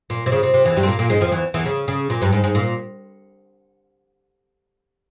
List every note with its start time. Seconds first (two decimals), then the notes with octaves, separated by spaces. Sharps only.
0.10 A#2
0.26 C3
0.32 C#3
0.43 C3
0.54 C3
0.65 E2 E3
0.76 G2 G3
0.83 C4
0.87 A#2 A#3
0.99 A#2 A#3
1.09 G#2 G#3
1.21 F2 F3
1.32 E2 E3
1.54 E2 E3
1.66 C#3
1.88 C#3
2.10 A#2
2.22 G2
2.33 G#2
2.44 G#2
2.55 A#2